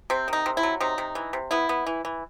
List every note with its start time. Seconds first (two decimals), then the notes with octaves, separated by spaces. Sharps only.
0.10 C3 C4
0.28 D#3 D#4
0.46 C3
0.57 E4
0.63 F#3
0.80 C3 D#4
0.98 C3
1.15 E3
1.33 C3
1.51 B3 E4
1.69 B3
1.87 E3
2.05 E3